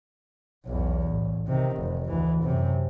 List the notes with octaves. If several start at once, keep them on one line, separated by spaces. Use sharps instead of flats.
B1 E2
A1
C3 D#3
F1
D2 E3
F#2 C3